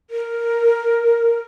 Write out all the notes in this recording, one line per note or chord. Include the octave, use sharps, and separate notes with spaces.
A#4